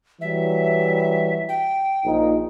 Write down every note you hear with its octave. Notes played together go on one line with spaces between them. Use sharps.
E3 F#3 G3 E5
G5
A#1 A#2 D#4